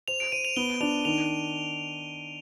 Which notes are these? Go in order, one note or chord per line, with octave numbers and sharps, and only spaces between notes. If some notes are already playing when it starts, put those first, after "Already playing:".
C5 F7
D7
C5 D#7
F7
B3 G7
D4 F7
D#3 F7